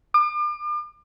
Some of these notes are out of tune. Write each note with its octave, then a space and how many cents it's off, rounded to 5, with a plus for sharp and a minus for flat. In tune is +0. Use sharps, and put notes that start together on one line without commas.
D6 +40